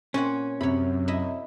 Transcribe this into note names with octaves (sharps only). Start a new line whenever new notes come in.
A#2 C4 C#4 F#5
F#2 C3 C#5 B5
E4 D#5 E5